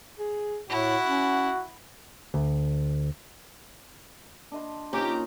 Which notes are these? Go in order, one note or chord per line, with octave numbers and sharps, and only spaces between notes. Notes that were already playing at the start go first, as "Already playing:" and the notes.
G#4
A2 E4 F#4 F#5
C#4
D2
D4 D#5 C6
A#2 C#4 D#4 G4 A#5